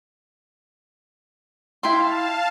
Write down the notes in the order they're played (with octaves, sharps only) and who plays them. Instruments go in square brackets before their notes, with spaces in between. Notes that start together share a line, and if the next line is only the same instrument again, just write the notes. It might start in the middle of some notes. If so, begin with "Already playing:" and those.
[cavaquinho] E4 G5 C6 [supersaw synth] F5 A5